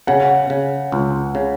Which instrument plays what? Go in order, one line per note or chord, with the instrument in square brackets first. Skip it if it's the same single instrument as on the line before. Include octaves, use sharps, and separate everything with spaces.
[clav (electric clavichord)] C#3 [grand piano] F#5
[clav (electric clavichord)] C#3
C#2
C#3